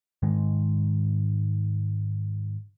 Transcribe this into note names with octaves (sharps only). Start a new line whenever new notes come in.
G#2 D#3 G#3